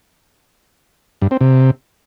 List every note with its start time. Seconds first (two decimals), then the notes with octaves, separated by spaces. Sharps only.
1.22 G2
1.31 C4
1.41 C3